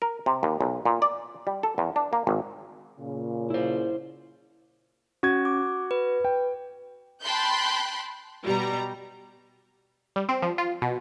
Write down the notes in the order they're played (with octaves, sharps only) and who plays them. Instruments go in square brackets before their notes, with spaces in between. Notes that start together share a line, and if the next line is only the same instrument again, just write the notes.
[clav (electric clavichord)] A#4
C3
D#2
B1
A#2
D5
G3
A4
E2
D4
A#3
G#1
[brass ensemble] A#2 C#3
[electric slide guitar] E4 C5
[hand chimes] C#4 [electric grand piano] F#4 G#6
[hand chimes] D6
B4
[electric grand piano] G5
[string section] G5 A5 B5 C6 F#6 G6
B2 G3 A#5
[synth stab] G3
C4
F3
F4
B2